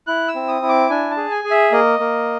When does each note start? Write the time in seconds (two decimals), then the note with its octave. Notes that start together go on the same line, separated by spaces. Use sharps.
0.07 E4 F#6
0.28 E6
0.35 C4
0.48 D#6
0.62 E4
0.69 D6
0.90 D4 G#5
1.11 A5
1.17 G#4
1.31 G#5
1.44 G#4
1.51 E5
1.72 A#3 D#5
1.99 A#3